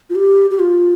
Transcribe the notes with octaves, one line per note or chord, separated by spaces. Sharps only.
F4
G4
G4
F4